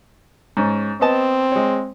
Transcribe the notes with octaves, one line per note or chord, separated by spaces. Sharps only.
G#2 C#4
B3 C4 D#5 A5
G#3 C#5